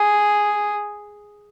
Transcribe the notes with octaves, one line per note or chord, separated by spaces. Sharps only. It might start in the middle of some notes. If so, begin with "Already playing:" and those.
Already playing: G#4